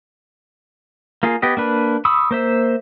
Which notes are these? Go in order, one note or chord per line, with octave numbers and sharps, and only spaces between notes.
A#3 F4 G#4
B3 G4 D#5
A#3 D4 B4
B5 C#6 D#6 E6
A#3 C5 E5